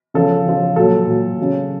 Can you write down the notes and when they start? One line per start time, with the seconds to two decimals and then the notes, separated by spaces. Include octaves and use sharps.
0.14 C#3 F3 A4
0.46 C#3 F3
0.76 A#2 F#3 A4
1.07 A#2 F#3
1.39 C#3 F#3